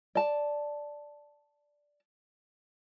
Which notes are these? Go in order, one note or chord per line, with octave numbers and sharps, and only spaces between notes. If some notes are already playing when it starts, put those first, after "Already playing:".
D5 A5